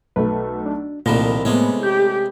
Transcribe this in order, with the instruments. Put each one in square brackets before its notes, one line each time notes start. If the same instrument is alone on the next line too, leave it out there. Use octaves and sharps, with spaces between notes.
[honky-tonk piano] B1 A3 [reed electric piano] B4
[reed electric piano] D4
[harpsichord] C2 D#3 F3 [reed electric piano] A#2 [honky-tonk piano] A3 B5 A#6
[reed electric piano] A2 A#3 [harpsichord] C3 G#3 C#4 [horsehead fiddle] B3
[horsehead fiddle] G4 [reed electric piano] G6